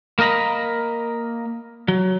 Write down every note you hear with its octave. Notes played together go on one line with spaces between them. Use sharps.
A#3 A#4 D#5 A#5 B5
F#3